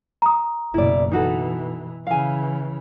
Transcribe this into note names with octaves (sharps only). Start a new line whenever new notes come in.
A#5 D#6
F#1 B2 E4 D5
B2 E3 D#4 F#4 A4
C#3 E3 F5 G#5